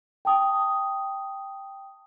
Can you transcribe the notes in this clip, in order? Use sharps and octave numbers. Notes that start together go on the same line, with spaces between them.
G5 A5 D#6